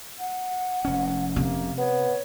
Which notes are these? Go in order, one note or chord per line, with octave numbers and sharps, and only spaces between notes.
F#5
F1 C#4
C3 A#3
B3 C#5